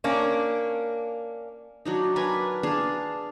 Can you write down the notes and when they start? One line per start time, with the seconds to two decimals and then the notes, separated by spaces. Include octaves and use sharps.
0.04 A#3 C#4 D4
1.85 F#3 D4 D#4
2.16 D4 A#4 B4 G#5
2.63 D4 G#4 F5 A5